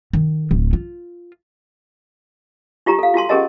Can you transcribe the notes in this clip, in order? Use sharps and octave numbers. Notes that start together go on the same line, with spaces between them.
D#3
D1 A3
F4
D#4 F4 G4 A#5
A4 F5
F4 F#4 A5 C6
C#4 G4 G#4 A#4 D#5 A5